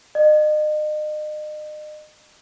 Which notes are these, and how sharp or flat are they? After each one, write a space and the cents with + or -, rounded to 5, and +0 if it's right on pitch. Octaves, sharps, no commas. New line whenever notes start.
D#5 -40